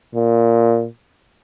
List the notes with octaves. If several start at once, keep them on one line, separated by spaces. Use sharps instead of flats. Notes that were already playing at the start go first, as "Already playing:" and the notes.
A#2